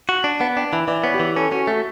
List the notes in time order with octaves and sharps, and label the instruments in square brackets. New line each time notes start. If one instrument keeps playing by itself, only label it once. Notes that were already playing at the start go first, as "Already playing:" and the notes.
[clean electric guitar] F#4
D4
[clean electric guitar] B3 [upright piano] F#5
[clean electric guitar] D4 [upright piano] G5
[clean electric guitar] E3 [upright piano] B5
[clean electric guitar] E3 [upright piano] D5
[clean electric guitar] B3 [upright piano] C#5
[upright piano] G4
[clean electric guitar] E3
[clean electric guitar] C#4 [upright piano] A4
[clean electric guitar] C#4 [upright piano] F#4
[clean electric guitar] A3 [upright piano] F#4